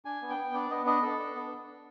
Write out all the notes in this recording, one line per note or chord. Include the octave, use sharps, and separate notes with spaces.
D4 G#5
B3
G5
B3
D4 D5
B3 D#5
D4 D#5
D4 A4
D4
B3